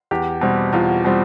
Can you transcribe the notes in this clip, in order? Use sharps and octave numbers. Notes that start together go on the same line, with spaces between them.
E2 G4
B2 G3 C4
E2 F4
B2 G3 C4